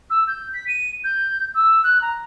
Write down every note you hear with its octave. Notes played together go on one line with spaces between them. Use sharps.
E6
G6
B6
D#7
G6
E6
F#6
A#5